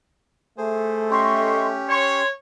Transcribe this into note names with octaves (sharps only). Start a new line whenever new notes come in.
A3 G#4 C5
C#4 G4 D#5 C6 C#6
C#5 C6